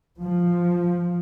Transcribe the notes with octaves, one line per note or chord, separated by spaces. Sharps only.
F3